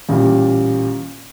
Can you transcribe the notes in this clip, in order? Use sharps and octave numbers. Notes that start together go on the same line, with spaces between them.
A1 A#2 G3